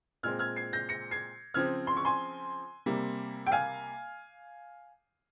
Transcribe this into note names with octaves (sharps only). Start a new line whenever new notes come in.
A#2 G#3 C4 F6 G#6
F6 G#6
G#6 C7
G6 A#6
A#6 C#7
G#6 C7
C#3 F3 C4 F6 G#6
C6
C#6
G#5 C6
C3 G3 A#3
G5
F5 G#5